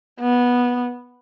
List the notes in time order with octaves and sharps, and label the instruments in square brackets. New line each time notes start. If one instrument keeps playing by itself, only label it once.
[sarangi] B3